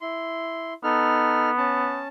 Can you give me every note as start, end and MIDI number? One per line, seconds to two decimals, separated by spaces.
0.01 0.73 64
0.01 0.73 84
0.84 2.02 59
0.84 1.50 63
0.84 1.50 69
0.84 1.50 89
1.58 2.08 61
1.58 2.08 81